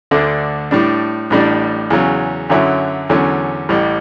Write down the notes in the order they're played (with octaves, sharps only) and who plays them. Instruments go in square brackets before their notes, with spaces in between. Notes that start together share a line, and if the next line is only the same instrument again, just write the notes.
[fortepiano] D2 D3 A3 D4
A2 G3 D4
A1 A2 G3 D4
E2 C#3 F#3 C#4
F#2 D3 F#3 C#4 E4
E2 D3 F#3 C#4
A1 A2 G3